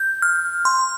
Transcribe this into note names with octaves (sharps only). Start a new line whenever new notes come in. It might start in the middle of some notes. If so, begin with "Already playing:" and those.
Already playing: G6
F6
C6